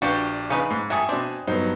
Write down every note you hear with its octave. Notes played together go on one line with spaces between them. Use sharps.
A#1 D4 F#4 G4 B4 D5 F5
C#3 C#4 D#4 B4
G#2
F#3 A3 G#4 E5 G5 G#5 D#6
B2 C4 D4
G2 F#3 B3 D#4 C5